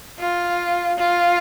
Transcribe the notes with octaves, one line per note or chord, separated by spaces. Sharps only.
F4
F4